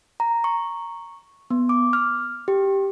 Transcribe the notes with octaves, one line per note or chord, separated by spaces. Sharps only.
A#5
C#6
B3
D6
F6
G4